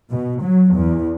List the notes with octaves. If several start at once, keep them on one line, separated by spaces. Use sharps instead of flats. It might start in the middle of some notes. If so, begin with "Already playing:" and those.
B2
F#3
E2